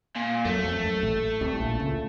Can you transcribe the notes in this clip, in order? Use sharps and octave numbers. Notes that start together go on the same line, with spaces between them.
A#2
F#2 A3
F2
F#2
A1 A2
C2 C3
A#1 A#2
C#2 C#3